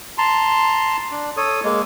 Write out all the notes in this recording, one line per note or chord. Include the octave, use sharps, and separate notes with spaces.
A5 A#5 C6
D4
A4 C#5 D#6
G#3 A#3